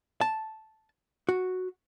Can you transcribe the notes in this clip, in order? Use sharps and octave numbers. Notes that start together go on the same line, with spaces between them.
A5
F#4